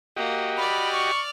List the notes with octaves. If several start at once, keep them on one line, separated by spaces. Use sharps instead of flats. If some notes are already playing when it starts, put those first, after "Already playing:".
A#3 F#4 G4 D#5
D5 B5 F6
C#6